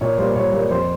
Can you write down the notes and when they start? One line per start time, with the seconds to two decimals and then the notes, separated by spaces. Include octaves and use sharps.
0.01 A#2 C#5
0.18 G3 A#3 C5
0.35 A#2 C#5
0.52 G3 A#3
0.71 F2 C5